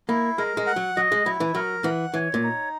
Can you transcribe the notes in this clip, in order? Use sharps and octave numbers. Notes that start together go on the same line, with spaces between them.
A#3 E4
G#3 A#4
G#3
F#5
F#3
F#3 D#5
G#3
F#3 E4
E3
F#3 A#4
E3 F#5
E3 C#5
A#2
D#4